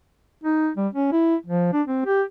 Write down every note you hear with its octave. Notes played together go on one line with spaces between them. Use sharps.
D#4
G3
C#4
E4
F3
D4
C4
G4